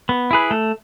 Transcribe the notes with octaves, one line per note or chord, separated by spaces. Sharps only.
B3
E4 G#4 B4
A3